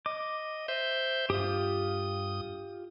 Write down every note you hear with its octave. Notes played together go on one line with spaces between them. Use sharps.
D#5 D6
C5 E5 G6
G2 F4 G4 D#6